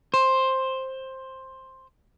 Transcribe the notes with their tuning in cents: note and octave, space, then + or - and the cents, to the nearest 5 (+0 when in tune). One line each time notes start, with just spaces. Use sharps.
C5 +10